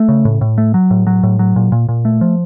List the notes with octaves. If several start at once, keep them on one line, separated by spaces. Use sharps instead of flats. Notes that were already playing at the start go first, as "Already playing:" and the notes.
Already playing: A3
C#3
A2
A2
A3
F#3
A2
F#3
A2
F#3
A#2
A#2
A#2
A3
F3